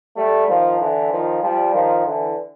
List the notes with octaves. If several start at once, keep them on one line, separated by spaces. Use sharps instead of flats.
G3 A3
D#3 F3
D3 E3
D#3 F3
F3 G3
D#3 F3
D3 E3